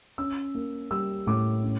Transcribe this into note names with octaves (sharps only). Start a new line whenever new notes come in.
C#4 E6
A#3
G3 E6
A2 D6
C#4